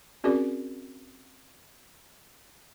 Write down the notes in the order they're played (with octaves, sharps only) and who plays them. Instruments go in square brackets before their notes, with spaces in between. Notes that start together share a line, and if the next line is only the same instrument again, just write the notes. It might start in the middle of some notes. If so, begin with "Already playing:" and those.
[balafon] C4 C#4 F#4 G#4 A#4 D5